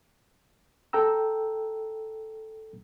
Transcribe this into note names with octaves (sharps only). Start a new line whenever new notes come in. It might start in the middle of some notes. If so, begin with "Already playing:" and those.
A4 G5 A#5 E6